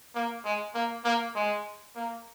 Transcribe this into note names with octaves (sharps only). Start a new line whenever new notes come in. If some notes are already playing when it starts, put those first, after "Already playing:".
A#3
G#3
A#3
A#3
G#3
A#3